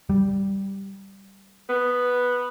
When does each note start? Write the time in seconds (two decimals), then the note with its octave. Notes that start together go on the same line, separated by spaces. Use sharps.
0.10 G3
1.69 B3